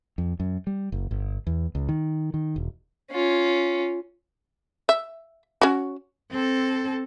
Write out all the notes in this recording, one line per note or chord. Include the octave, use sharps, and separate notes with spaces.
F2
F#2
G3
F#1
G1
E2
C#2
D#3
D#3
E1
C#4 F4
E5
C#4 F#4
C4 A4